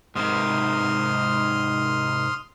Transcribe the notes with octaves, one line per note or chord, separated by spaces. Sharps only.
G#2 C3 D#3 C6 D#6 F6